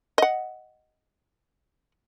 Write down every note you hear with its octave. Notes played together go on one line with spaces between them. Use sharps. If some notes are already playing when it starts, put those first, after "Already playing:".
D#5 F#5